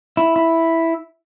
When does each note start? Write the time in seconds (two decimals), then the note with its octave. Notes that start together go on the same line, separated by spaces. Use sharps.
0.17 E4
0.36 E4